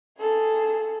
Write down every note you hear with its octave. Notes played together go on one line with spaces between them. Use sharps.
G#4 A4